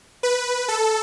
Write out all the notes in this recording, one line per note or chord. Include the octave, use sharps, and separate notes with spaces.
B4
A4